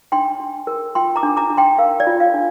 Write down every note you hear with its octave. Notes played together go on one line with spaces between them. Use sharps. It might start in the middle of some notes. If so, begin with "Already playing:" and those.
D4 G5 C6
D4
A#4
F4 G5 C6
A#5 D6
D4
A#5 D6
D4
G5 C6
A#4 F5
D5
F4
F5
D4